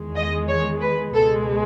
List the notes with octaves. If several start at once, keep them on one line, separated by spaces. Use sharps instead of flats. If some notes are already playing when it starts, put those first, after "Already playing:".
Already playing: E2 D#3 G#3
D#5
C#5
B4
C#2 B2 G#3 A4